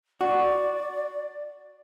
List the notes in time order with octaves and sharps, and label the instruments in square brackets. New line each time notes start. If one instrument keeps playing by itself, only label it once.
[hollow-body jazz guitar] F#4 [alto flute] D5